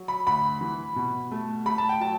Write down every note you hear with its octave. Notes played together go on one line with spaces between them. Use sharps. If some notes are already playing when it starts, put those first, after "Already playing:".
Already playing: F#3
B5
D2 B5
E3
B2
A3
A3 B5
A5
G5
F#3 A5